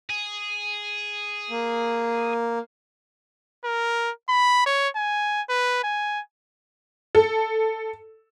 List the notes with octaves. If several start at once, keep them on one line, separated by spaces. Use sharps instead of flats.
G#4
A#3
A#4
B5
C#5
G#5
B4
G#5
A4